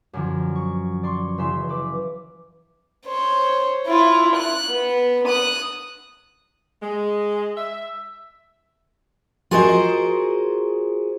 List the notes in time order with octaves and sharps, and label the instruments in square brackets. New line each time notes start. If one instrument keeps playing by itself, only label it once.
[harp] F#2 D3 F3
C#6
D5 C6 C#6
F#1 C#3 E3 E5 C6
B4 D6
[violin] C5 C#5
E4 F4
F#6
B3
D#6 F#6
[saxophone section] G#3
E5
[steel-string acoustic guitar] F4 F#4 G#4 A#4 C5 D#5